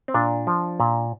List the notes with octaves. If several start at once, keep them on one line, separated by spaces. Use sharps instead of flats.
C4
A#2 D4
F3
A#2